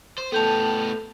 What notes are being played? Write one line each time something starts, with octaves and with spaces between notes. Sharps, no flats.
C5
A2 B3 A4 G5 A5 G6 F7